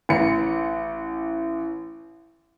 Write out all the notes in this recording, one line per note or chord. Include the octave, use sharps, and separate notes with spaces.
A1 C#7